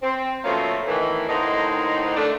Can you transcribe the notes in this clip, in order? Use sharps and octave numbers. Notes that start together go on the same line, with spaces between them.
C4
B2 F3 A3 A#3 C4 C#4
A2 D#3 E3
A2 D3 A#3 C4 D#4
A3 D4